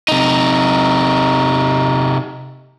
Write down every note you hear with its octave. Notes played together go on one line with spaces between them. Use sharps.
C3 D#4